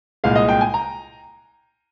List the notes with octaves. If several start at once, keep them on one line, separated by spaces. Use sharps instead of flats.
C2 A#2 G#3 F5
D#5
G5
G#5
A#5